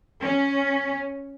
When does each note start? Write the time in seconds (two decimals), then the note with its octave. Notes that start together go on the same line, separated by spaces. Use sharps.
0.21 C#4